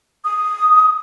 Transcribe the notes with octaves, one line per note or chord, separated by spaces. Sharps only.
D#6